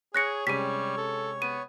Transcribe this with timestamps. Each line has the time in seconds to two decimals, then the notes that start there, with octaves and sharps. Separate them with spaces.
0.15 G#4 C#5 F#6 A#6 C#7
0.47 C3 G3 G#3 C#4 B6 D#7
0.98 A4
1.42 B3 D#7